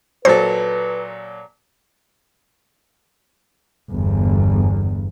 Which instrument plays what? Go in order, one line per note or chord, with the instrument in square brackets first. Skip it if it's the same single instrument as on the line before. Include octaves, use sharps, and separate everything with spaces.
[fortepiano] A#2 F#3 A4 [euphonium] B4 [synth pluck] C5
[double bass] G1 E2